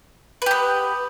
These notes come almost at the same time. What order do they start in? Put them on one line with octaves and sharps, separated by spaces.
B4 G4 B3